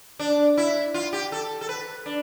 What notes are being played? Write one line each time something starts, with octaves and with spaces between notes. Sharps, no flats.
D4
E4
F4
G4
A4
A4
B4
D4